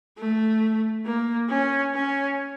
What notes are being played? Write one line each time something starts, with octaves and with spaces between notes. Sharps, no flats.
A3
A#3
C#4
C#4